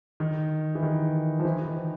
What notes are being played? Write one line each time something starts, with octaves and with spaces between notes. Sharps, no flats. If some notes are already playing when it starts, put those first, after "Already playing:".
D#3
E3
D#3
F3
E3
D#3